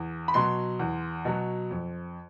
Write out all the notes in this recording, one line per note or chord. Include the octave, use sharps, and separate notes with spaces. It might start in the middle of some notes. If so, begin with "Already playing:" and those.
Already playing: E2
B5
B2 F#3 C6
E2
B2 F#3
F2